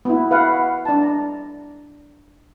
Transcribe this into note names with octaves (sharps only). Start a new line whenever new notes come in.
B3 E4
B4 F5 F#5
D4 A5
A#5